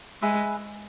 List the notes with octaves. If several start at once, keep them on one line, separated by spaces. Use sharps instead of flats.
G#3 G#4 B4 E5 B5